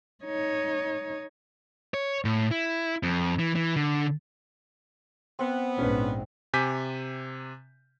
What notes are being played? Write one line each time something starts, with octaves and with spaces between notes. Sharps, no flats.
D#4 C#5
C#5
A2
E4
F2
E3
E3
D3
B3 C4
A#1 G#2 C#4 D4 B4
C3 G#5 D6 G6 B6